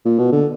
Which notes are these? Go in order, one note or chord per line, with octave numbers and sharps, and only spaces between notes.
A#2
B2
D3